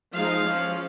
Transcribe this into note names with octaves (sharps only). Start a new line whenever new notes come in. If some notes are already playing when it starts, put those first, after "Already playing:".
F3 G#3 D#4 F5
F3 G#3 C#4